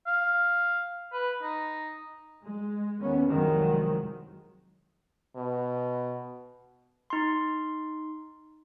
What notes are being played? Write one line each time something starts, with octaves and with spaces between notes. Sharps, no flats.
F5
B4
D#4
G#3
D#2 B3 C#4
C2 F2 D#3 F#3 G#3
B2
D#4 C6